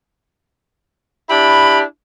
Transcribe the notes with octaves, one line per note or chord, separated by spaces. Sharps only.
D4 E4 G4 B5